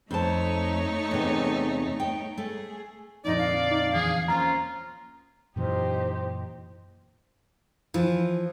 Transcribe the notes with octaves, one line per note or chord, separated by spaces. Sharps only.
F2 A3 D#4 C#5 A5
E2 C3
G5
A3 G#4
F2 A#2 D3 D#4 D5
F5
D#4
E2 E3 G#4
A#3 C#4 F4 C5 A#5
F#2 A#2 E3 D#4 G4 C5
E3 F3